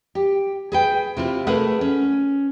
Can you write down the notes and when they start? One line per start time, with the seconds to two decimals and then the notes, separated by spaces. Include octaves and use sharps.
0.15 G4
0.72 G#4 B4 G5
1.17 C3 E4 F4
1.47 A3 G#4 A#4 B4 F#5
1.81 C#4